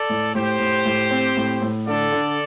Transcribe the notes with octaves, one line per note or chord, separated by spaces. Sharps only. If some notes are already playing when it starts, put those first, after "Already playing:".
Already playing: A4 D5
A2
A2 G4 C5
A2
A2
C4
A2
A2
D3 A4 D5
D3